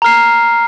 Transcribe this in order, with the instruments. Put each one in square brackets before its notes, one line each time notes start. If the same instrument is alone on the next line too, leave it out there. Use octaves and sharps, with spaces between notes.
[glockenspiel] A#5 F6 C7